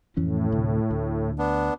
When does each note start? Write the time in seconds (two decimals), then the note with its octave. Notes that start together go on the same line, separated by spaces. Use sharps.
0.17 F2 A2 E3 C#4
0.52 D2 C3
0.90 D2
1.38 B3 D4